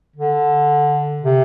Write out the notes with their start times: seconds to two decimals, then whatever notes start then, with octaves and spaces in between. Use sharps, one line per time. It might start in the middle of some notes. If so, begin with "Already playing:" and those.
0.16 D3
1.23 C3